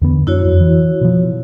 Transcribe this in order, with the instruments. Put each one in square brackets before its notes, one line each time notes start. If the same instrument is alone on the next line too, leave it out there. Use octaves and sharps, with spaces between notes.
[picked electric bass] E2 D3 B3
[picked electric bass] F#2 D4 [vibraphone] E4 F#4 C#5
[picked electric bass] F2
E3
B2 F3